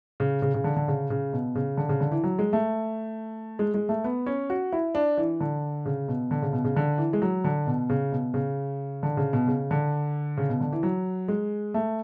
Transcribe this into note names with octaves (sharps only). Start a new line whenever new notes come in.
C#3
C#3
C#3
D3
D3
C#3
C#3
B2
C#3
D3
C#3
D3
E3
F#3
G#3
A3
G#3
G#3
A3
B3
C#4
F#4
E4
D4
E3
D3
C#3
B2
D3
C#3
B2
C#3
D3
E3
G#3
F#3
D3
B2
C#3
B2
C#3
D3
C#3
B2
C#3
D3
C#3
B2
D3
E3
F#3
G#3
A3